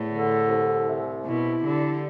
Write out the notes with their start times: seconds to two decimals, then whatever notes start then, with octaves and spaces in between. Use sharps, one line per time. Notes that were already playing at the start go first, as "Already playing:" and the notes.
Already playing: E2 A2
0.10 D3
0.48 C2
0.87 C3
1.25 B2 E4
1.64 D3 G3